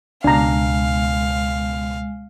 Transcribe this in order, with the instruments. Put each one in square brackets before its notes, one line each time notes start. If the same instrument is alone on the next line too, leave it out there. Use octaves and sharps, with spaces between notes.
[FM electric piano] C#2 B2 [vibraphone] G#3 [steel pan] D4 A#5 [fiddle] F5